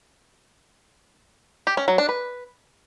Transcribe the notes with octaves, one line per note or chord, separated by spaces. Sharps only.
G4
C#4
F#3
D4
B4